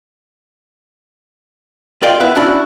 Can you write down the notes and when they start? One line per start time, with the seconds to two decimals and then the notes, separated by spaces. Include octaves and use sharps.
2.02 F4 A#4 D5 D#5 F5 G5
2.20 B3 E4 B4 D5 E5
2.35 C#4 D4 E4 F#4 D5